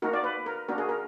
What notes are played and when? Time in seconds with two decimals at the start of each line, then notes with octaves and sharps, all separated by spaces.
0.02 A#3 D#4 F#4 A#4
0.13 D5
0.24 B4
0.46 A#4
0.69 A#3 D4 F#4 A#4
0.78 G#4
0.89 A#4